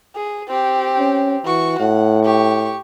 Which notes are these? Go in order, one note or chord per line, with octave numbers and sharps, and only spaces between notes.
G#4
C4 G4
C#4
E3 F#4 C#6
A2 F#5
G4 C#6